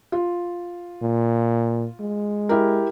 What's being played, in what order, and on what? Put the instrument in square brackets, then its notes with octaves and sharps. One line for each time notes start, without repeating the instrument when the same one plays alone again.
[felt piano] F4
[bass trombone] A#2
G#3
[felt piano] E4 G4 A#4